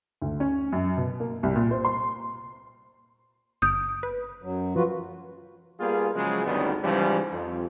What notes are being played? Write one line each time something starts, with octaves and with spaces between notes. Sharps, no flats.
D2
C#4
F#2
B2
A#3
C2
A#2
C5
C6
G1 D#6 F6 G6 D7
B4
F#2 F#3
F3 F4 F#4 B4
G3 A#3 B3 F4 G#4
C#3 F3 F#3 G#3
G#1 D2 D#3 G3 B3 C#4
G#2 C#3 E3 F3 G3
F2